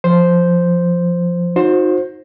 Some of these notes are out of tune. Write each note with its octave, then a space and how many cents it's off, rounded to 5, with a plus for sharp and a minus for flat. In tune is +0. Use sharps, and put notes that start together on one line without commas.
F3 +0 C5 +0
D#4 +10 F#4 -35 C5 +15